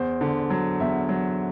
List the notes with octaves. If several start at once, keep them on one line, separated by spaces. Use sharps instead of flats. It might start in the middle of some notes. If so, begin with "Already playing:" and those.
Already playing: E2 C5
D3
F#3
E2 E5
F#3